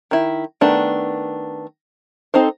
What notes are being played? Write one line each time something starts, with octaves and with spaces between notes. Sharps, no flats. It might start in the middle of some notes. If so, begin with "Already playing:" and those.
D#3 E4
D#3 A3 B3 D4
C4 D#4 A4 C5